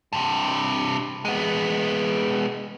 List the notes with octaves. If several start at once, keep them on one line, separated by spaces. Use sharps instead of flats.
G2 C3
G#3 B3